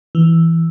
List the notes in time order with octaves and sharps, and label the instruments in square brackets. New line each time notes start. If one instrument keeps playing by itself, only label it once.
[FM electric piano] E3